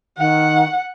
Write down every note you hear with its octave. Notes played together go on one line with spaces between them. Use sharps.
D#3 F#5